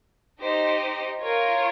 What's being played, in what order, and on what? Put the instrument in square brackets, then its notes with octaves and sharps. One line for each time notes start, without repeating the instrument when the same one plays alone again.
[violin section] D#4 G4 C5 D#5
F4 A#4 C#5